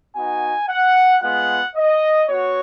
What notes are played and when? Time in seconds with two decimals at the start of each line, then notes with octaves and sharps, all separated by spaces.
0.15 B3 D#4 F#4 G#5
0.69 F#5
1.22 G#3 B3 F4 F#5
1.75 D#5
2.28 B3 F#4 C#5